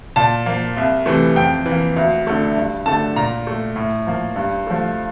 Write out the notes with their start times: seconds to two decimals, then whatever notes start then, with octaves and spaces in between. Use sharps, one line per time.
0.16 A#2 A5
0.46 F3 A#3
0.77 C2
1.06 C3 E3 A3
1.36 F2 G5
1.66 E3
1.71 A#3
1.96 D2
2.27 D3 A3
2.57 G2
2.86 D3 A3 A5
3.16 A#2 A#5
3.47 A3
3.76 A2
4.07 F3 A#3
4.36 G2
4.67 F3 A3